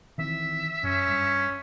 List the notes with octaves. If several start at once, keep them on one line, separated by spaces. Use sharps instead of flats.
D#3 E3 C4 E5
F#2 C#4
G2